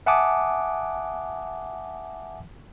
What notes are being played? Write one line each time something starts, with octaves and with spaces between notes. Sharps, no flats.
E5 F#5 G#5 A5 D6 D#6